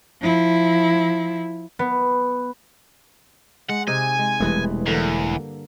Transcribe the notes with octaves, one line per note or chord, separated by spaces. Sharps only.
F3 E4
B3
G#3 F#5
C3 D#4 G#4 G#5
G#3
E1 G2 E3 G#3 A3 G#4
E2 D3 A#3